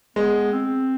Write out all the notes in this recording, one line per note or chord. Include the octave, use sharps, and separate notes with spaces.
G#3 B3
C4